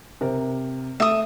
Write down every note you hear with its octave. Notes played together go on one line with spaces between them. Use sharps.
C3 A#4
A3 E5 D#6